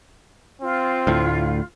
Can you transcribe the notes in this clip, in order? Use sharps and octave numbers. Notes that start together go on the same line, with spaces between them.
C4 F4
D2 A2